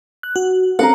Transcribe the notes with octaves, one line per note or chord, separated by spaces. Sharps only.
F#6
F#4
C4 C#4 A4 A#4 D#5 F#5